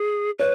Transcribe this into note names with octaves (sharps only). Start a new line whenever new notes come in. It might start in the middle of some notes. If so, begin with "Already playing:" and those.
Already playing: G#4
B4 C#5